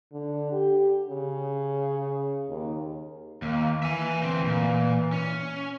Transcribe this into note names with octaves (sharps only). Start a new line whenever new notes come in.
D3
G4
C#3
D#2
D#2 A#3
E3 E5 G#5
D2 C4
A#2
C#4